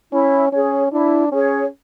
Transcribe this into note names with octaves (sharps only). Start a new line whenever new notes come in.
C#4 E4
C#4 G#4 C#5
D4 E4
C#4 G#4 C#5